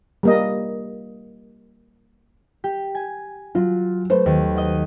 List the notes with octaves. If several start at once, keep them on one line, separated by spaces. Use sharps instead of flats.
G3 A#3 D#5
G4
G#5
F#3 F4
A3 B4 C5
D#2
D#5 F#5